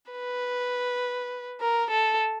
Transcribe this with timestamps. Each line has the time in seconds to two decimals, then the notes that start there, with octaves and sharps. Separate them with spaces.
0.12 B4
1.60 A#4
1.91 A4